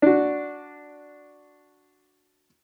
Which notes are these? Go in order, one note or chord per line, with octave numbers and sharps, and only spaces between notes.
D4 F#4